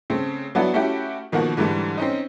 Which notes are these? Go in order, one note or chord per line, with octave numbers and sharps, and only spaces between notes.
C#3 A3 C4
F#3 B3 D4 E4 F#4 A4
A3 C#4 E4 F#4 G4
B2 D#3 F3 A#3 F#4
G#2 D3 E3 G3 A3
C4 C#4 D#4